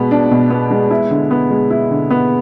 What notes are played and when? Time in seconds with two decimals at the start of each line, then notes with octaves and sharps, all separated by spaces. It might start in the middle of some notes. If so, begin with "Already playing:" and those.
Already playing: B2 G#3 B3
0.11 D4
0.31 B2
0.50 B3
0.71 G#3
0.91 E4
1.11 D3
1.31 B3
1.50 G#3
1.70 E4
1.91 D3
2.10 B3